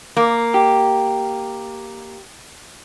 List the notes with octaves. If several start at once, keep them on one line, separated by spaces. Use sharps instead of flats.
A#3
G4